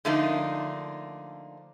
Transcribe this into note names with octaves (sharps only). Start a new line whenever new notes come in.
D3 F3 A3 A#3 D4 D#4